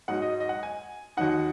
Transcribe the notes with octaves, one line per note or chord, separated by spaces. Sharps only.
G#2 F#3 D#4 F#5
D#5
D#5
F#5
G#5
D#2 D#3 F#3 D#4 F#5